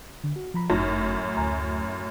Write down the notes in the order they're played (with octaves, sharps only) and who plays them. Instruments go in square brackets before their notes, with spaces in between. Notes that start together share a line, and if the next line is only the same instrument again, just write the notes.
[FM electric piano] D3
F#4
F3 A#5 B5
[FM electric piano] G1 D#4 A#6 [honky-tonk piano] F#2 A2
[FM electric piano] D2 G#5 A#5